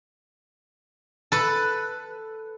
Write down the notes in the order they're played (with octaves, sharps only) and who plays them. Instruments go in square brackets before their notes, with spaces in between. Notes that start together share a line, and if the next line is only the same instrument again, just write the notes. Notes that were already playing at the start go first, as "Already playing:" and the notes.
[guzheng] A4 B4